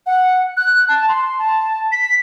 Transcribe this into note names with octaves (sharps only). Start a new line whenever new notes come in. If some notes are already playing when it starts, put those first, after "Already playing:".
F#5
F#6
A5
C6
A5
B6